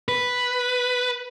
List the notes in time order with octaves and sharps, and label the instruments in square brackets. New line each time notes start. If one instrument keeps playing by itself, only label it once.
[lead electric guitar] B4